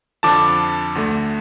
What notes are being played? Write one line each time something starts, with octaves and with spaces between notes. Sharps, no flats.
F2 D3 F3 A5 D6
D2 D3 A3